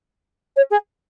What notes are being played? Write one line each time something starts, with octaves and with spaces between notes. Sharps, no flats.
C#5
G#4